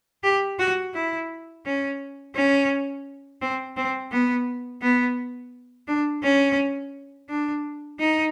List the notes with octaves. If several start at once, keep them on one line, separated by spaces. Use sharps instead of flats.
G4
F#4
E4
C#4
C#4
C4
C4
B3
B3
D4
C#4
D4
D#4